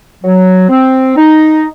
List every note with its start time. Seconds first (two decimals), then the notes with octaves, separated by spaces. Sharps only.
0.24 F#3
0.69 C4
1.16 D#4